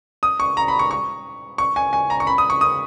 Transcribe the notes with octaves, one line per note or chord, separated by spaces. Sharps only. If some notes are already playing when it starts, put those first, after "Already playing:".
D#6
C#6
A#5
B5
C#6
C#6
C#6
G#5
G#5
A#5
C#6
B5
D#6
C#6
D#6